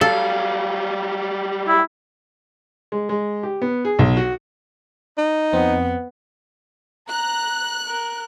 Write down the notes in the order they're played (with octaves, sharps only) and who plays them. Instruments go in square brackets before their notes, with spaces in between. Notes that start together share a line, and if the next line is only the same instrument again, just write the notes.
[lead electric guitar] F#3 G3 [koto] A4 [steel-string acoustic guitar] F5
[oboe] E4
[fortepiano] G#3
G#3
G4
B3
G#4
B1
F#4
[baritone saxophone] D#4
[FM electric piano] F2 C4 [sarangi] B3
[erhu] A#5 [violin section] F#6
[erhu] A#4